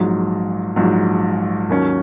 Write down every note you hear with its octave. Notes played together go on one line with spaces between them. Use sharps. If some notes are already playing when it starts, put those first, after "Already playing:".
Already playing: A#1 G#2 F#3
A#1 G#2 F#3
D#2 D#3 F#3 C#4